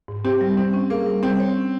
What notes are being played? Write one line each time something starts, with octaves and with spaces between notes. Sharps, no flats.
G#2
C4 G4
G3
G3 C4
C#4
A#3 G#4
G3
G3 C4
C#5
C#4